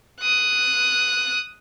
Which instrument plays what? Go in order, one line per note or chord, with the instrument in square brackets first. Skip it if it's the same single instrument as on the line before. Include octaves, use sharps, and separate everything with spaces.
[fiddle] D#6 F#6